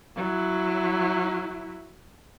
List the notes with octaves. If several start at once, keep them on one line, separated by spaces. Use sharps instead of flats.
F#3 E4